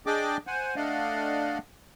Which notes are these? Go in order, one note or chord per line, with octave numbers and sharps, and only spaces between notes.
D4 G#4 D5 D#5 G5 D6
C5 F#5 G#5
A3 D4 D5 D#5 F5 F#5